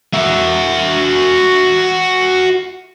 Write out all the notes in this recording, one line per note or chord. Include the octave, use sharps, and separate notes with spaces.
F#4 E5